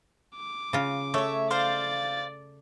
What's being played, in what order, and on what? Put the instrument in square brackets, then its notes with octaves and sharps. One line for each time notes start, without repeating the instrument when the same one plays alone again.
[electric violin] D6
[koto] C#3 F4
[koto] A3 [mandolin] C#5 E5
[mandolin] C5 F5 [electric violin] D5 A6